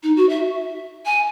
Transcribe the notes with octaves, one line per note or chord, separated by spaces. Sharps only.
D#4
F#4
E5
G#5